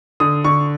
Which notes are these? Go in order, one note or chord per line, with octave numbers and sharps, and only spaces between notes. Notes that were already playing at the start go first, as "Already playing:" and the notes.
D3 D#6
D3 C#6